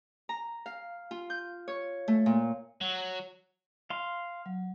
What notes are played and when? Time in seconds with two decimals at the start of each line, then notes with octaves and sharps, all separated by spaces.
0.29 A#5
0.66 F5
1.11 F4
1.30 G6
1.68 C#5
2.08 A3
2.26 A#2
2.81 F#3
3.90 F5 C6
4.46 F#3